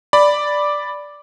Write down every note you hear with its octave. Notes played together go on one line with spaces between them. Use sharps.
D5 B5